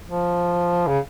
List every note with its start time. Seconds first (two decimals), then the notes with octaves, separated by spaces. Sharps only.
0.09 F3
0.87 C#3